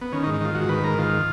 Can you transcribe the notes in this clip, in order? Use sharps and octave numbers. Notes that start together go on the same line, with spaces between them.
B3
D#3 C#4
D#4
G#2
D#4
D#3 F4
G#2 F#4
D#3 B4
G#2 A#4
D#3 F4